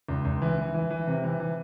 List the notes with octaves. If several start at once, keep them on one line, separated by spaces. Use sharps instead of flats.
C#2
C#2
E3
E3
E3
E3
C3
E3
E3